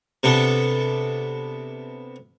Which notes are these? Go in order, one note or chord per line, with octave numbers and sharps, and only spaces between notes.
C3 B3 D4 A4